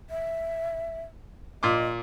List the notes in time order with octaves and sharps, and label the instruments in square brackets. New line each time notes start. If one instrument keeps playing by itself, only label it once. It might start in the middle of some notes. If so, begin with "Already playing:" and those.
[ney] E5
[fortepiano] A#2 C6 D6 [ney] D#5